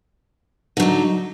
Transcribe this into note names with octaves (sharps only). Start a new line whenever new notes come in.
D3 F#3 D#4